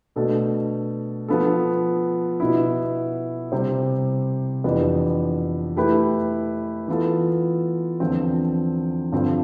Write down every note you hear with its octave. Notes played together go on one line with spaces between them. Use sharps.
B2 A3 D4 A4
F3 B3 F4 A4
B2 B3 E4
C3 G3 C4 G4 C5
F2 E3 B3 D4 G4
A3 E4 G4 B4
E3 B3 F4 A4
E2 D3 F3 C4
G2 D3 F3 C4